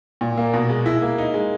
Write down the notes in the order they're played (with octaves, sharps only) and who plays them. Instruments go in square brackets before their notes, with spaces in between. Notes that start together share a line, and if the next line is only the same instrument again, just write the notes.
[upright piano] A#2
A#3
B2
G#3
E4
A#3
D#4
G#3